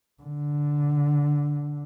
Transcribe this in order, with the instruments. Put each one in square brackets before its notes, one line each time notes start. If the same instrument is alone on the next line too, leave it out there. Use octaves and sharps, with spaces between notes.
[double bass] D3